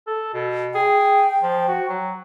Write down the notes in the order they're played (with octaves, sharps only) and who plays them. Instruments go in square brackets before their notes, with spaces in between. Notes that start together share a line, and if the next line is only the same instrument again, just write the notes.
[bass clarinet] A4
B2
[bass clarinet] G#4 [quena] G5
[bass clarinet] F3
F#4
F#3